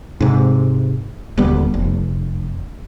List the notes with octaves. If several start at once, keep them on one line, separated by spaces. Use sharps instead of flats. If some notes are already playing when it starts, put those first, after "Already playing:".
G#2 C3
D#1 D2 G3 B3
F1